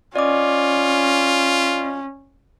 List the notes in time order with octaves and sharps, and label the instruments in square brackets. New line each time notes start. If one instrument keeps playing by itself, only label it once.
[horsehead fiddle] C#4 [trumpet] F4 [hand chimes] D5 D#5 D6